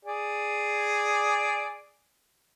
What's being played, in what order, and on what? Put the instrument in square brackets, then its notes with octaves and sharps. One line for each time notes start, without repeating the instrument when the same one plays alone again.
[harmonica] G#4 D5